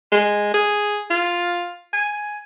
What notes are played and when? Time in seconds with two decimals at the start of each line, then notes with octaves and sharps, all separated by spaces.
0.12 G#3
0.54 G#4
1.10 F4
1.93 G#5